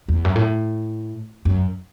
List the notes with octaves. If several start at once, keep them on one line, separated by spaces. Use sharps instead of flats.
E2
F#2
A2
F#2